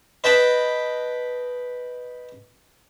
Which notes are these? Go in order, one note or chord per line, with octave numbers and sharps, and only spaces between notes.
B4 D#5 G5 A5 B5